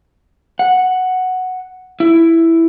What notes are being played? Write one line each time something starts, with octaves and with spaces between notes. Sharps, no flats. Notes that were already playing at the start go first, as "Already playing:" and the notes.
F#5
E4